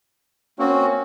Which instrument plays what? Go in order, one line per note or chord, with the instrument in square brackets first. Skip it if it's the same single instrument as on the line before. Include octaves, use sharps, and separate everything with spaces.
[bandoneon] A#3 C4 F#4 [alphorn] C#4